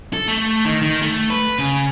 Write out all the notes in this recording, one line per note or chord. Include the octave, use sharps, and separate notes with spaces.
A4
A3
D#3
D#3
A3
B4
C#3